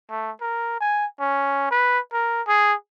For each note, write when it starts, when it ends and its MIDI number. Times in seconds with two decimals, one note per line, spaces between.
0.10 0.31 57
0.41 0.76 70
0.81 1.06 80
1.20 1.68 61
1.71 1.99 71
2.13 2.42 70
2.47 2.74 68